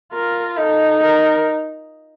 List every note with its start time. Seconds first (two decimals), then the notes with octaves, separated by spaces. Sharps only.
0.13 F4 A#4
0.57 D#4 A4
1.01 A#4